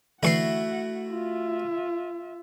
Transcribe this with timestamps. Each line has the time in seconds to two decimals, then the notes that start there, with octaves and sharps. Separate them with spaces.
0.23 D3 E3 A3 E4 F#4 F#5 C7
1.09 F4 E5